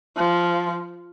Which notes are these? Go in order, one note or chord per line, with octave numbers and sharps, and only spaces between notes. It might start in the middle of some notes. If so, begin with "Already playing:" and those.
F3